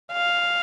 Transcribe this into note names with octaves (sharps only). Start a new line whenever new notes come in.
F5